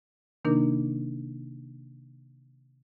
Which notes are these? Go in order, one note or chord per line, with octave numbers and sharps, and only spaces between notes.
C3 D#3 A#3 D4 D#4 A#4